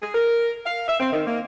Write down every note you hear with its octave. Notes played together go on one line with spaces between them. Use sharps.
G#4
A#4
F5
E5
C4
D#3
A#3